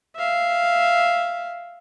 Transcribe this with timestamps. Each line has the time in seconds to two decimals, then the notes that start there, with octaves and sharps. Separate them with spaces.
0.16 E5 F5